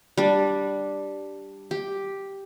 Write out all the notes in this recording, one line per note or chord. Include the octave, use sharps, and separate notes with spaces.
G3 D4
G4